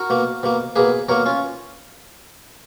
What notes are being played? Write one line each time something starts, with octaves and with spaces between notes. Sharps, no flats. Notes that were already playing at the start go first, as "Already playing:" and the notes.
Already playing: F#4 A#4
B2 A#3
B2 A#3
B2 A#3 G#4 B4
B2 A#3 A#4 C#5
C#4 F4